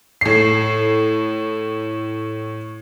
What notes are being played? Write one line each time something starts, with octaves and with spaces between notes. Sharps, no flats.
A2 C7